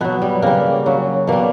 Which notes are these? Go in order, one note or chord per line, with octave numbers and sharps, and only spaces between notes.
B2 F#3 B3
G3
C#3 G3 A#3
C#3 F#3
B2 G3 A#3